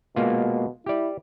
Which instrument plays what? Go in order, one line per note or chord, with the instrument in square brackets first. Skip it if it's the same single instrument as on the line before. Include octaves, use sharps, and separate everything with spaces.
[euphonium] B2 [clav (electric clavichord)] G#3 A#3 F4
[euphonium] E4 [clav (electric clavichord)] G4 D5